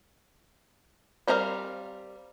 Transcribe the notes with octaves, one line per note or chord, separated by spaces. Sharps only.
G3 C4 A#4 D#5 F5